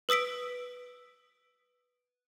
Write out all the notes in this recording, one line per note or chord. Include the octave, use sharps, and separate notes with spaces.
B4 D#6 E6 B6 D7